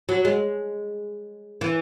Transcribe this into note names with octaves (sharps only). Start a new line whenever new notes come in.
F#3
G#3
E3